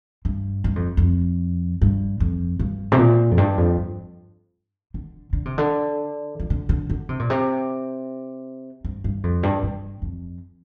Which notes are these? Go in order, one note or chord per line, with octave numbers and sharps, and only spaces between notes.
G2
G2
F2
F2
G2
F2
G2
C3
A#2
F2
G2
F2
G2
D3
D3
C3
D3
F3
D3
D3
D3
C3
A#2
C3
G2
G2
F2
G2
G2
F2